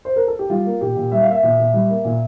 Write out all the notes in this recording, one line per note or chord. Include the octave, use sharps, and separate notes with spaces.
C5
A#4
A4
G4
G3 F4
A#3
A#2 G4
A#2
G3 E5
F5
A#3 E5
A#2
A#2
G3
A#3
A#2